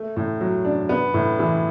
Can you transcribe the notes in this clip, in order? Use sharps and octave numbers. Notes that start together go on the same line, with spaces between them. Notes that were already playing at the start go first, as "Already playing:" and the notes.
Already playing: A3
A2
F#3
D4
B3
A2
E3